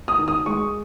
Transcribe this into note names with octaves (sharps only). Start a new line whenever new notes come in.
D#6
D#3
D#6
G#3 C#6